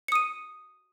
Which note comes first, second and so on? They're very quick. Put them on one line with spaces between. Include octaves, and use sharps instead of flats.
C#7 D#6 D#7